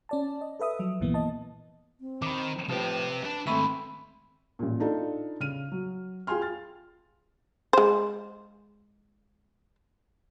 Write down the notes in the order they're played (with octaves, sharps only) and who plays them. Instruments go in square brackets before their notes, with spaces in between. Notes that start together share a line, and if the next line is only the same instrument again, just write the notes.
[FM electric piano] C#4 D5 A5
D#5
A4 B4 E5 D#6
F3 F#3
C2 G2 A#2 E3 A#3 B3
D#5 A5
[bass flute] C4
[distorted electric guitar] D#3 [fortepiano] B5 D6
[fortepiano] A2 F3 [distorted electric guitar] C3 G4 [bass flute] B4
[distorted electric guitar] D4 A5 [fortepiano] B4
[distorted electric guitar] D#3 G#3 [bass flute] A3 [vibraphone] C4 B5 [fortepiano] E5 C#6
[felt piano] A1 A#2
D4 D#4 F4 A4
C#3 F6 D#7
F#3
F4 G#4 G5 G#5 C6 F6
F6 A6
[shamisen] G#3 C5